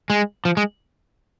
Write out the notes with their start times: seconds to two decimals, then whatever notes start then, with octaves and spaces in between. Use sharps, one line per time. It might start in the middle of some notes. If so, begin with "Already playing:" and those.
0.10 G#3
0.45 F3
0.57 G#3